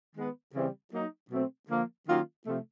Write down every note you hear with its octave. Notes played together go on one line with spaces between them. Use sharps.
D#3 G#3 B3
C#3 E3 G3 C4
F#3 A#3 D#4
B2 F#3 A3 C4
D3 F3 A#3
D#3 F#3 A#3 C#4 F4
C3 F3 A3